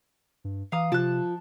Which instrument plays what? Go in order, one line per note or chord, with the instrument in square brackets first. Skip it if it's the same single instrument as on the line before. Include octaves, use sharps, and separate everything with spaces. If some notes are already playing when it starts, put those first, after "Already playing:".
[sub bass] G2
[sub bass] E3 [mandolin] F5 A#5 D#6
[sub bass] C3 [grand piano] F3 [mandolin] A5 F#6